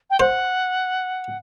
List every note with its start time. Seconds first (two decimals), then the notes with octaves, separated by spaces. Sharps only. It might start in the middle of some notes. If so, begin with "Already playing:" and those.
0.10 G5
0.20 C5 F#5